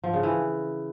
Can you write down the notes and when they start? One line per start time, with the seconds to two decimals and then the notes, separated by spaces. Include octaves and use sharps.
0.04 F3
0.13 C#3
0.23 E3